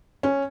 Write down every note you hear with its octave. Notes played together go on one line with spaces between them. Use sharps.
C#4